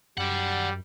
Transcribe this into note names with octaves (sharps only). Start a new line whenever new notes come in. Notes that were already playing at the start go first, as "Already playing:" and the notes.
F#2 G3 D5 F#5